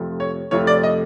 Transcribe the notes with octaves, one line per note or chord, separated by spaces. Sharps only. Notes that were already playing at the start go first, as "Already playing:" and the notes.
Already playing: F2 C3 F3 A3
C#5
F2 C3 F3 A3 C#5
D5
D#5